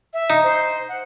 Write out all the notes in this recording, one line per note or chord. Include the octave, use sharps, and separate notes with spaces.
E5
D#4
C5
F#5